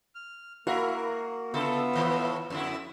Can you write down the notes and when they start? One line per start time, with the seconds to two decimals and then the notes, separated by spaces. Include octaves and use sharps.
0.15 F6
0.67 A#3 E4 F#4 A#4 F5
1.54 C#3 B3 F4 A4 E5
1.93 A2 D#3 E3
2.50 F2 D3 E4 E6